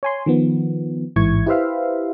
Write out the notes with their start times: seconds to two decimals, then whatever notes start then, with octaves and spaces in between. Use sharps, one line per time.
0.03 C#5 G#5 C6
0.26 D#3 F3 B3
1.16 A1 G#2 E3 E4 C#6 G#6
1.46 E4 G4 B4 C5 E5 F5